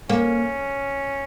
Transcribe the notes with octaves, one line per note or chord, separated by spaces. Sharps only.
A#3 C#4